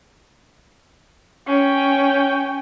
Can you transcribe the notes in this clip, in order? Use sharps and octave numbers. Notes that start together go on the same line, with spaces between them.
C#4 G5